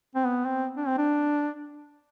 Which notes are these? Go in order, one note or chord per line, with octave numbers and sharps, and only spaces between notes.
C4
B3
C4
D4
C4
D4